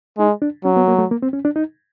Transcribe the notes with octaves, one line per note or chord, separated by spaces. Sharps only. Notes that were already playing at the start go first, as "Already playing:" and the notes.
G#3 D#4
D4
F#3 C#4
B3
A#3
A3
A#3
C4
C#4
D4
D#4